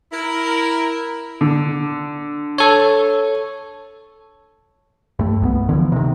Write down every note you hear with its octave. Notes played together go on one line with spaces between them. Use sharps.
E4 A#4
D3
A4 C#5
G2 A3
C2 G#3 B3
D3 E3 F3
C3 D#3